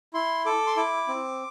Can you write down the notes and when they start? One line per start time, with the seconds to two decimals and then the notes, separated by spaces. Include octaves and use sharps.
0.14 E4 C6
0.46 A4 D6
0.67 C6
0.77 E4 D6
1.08 C4